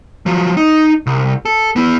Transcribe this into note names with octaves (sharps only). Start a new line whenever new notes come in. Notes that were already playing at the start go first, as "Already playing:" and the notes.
F3 F#3
D#4
C2
A4
B3 E4